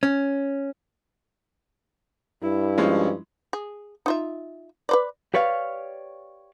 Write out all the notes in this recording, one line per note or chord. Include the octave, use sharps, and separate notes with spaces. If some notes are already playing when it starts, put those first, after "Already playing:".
C#4
G2 E4
F3 G#3 C#4
G#4
D#4 F4 E5
B4 C5 D5
G4 B4 C#5 D5 F5